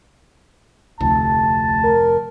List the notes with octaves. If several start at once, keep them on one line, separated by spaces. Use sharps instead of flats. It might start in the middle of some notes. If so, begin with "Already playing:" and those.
F1 D2 A5
A#4